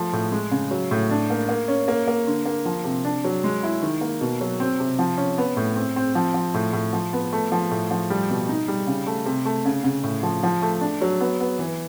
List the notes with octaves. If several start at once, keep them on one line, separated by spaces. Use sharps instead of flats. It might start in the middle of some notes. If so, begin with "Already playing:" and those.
Already playing: F3 A3
A2
G#3
C#3
F#3
A2
D4
A#3
A#3
C#4
A#3
A#3
D3
A#3
F3
C3
D4
F#3
G#3
E4
D#3
A#3
B2
F#3
C4
C3
F3
C#4
B3
A2
C4
C4
F3
F3
A2
A2
F3
B3
A3
F3
A2
F3
G3
B2
D#4
G3
C#3
A3
C3
A3
C#3
C#3
A2
F3
F3
A3
D4
F#3
B3
B3
E3